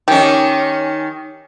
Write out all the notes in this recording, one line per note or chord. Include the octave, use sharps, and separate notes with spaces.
D#3 C#4 G4